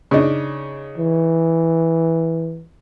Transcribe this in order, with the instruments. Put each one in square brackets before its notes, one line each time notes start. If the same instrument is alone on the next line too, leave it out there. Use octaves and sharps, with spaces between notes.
[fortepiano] C#3 D4 D#4
[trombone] E3